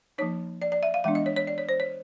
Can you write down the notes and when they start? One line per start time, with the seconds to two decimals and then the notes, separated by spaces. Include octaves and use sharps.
0.18 F3 A#3 D#4 C#5
0.62 D5
0.72 D5
0.83 E5
0.94 F5
1.04 E3 G#3 B3 D4 E5
1.15 D#5
1.26 C#5
1.36 C#5
1.47 D5
1.58 C#5
1.69 C5
1.80 C#5